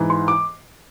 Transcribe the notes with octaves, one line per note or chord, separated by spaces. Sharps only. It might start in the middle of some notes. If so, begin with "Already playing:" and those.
Already playing: G#2 E3
C6
D6